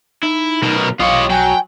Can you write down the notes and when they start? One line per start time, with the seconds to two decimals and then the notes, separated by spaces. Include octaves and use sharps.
0.23 D#4 E4
0.63 B1 B2 A#4
1.00 B1 F4 G4 C#5 D#5 F5
1.30 F#3 G5 G#5